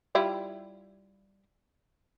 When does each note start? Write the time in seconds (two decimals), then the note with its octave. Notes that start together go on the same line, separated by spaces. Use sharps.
0.15 G3 E4 F4